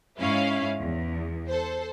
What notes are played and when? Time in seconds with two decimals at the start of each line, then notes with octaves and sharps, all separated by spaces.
0.19 G#2 C#4 E4 F5
0.79 E2
1.48 A4 C5